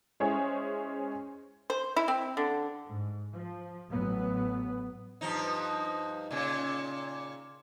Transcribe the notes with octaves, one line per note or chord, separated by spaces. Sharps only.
G#3 C#4 E4 G#4 C5 C#5
C5
E4
C4
D3
G#2
F3
A1 F#3 B3
G2 F3 D#4
A#2 C#3